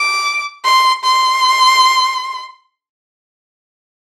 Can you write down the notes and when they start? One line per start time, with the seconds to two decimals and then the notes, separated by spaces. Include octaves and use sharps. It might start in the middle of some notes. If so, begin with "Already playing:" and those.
Already playing: D6
0.65 C6
1.04 C6